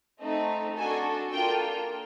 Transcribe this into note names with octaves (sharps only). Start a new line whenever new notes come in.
A3 C4 D#4
D4 F#4 A4 G#5
A#3 D4 F4 A4 G5